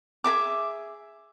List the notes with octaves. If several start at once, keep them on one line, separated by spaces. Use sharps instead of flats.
G#4 A#4 E5 D6